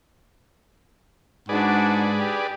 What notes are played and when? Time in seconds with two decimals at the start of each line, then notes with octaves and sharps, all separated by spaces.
1.49 G#2 D4 F#4 G#4 B4 D5
2.19 G4